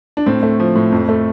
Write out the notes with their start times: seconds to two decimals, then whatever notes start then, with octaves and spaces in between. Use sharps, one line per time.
0.17 D4
0.26 A2 C4
0.43 A3
0.60 F3
0.76 A2
0.92 F2
1.09 A3